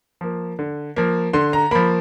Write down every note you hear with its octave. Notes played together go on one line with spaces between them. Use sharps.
F3 A#3
D3
F3 A#3
D3 C6
A#5
F3 A#3 B5